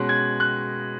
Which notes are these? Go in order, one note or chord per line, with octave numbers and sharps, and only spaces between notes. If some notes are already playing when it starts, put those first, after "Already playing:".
Already playing: B2 G#3 C#4 F#6
G#6
F#6